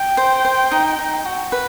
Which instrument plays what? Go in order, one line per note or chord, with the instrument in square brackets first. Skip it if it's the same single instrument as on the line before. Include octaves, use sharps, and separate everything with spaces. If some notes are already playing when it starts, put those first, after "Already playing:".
Already playing: [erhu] G5
[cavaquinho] C5
C5
D#4
D#4
F#4
B4